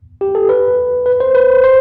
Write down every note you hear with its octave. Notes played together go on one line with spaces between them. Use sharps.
G4
A4
B4
B4
C5
B4
C5
C5